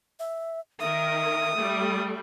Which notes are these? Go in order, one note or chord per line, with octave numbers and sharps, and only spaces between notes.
E5
D#3 A#4 E5 D#6
G3 A3